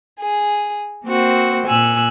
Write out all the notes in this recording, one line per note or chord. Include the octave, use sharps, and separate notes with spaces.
G#4
A#3 C4 F#4
A#2 G#5 E6 F#6